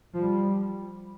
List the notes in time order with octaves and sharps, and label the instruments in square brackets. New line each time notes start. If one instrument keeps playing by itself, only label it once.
[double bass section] F3 [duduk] G3